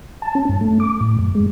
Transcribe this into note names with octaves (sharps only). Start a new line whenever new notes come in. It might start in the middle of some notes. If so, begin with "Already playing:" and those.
A5
C#4
G2
A3
D6
A2
F#2
G#3